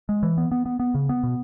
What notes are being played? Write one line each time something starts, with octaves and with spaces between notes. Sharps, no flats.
G#3
E3
B3
B3
B3
B3
C#3
B3
B2